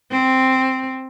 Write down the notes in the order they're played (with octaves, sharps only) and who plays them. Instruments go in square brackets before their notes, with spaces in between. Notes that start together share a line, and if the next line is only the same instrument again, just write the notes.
[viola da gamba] C4